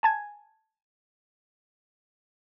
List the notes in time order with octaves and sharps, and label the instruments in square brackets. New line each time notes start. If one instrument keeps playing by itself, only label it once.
[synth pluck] G#5 A5 G#6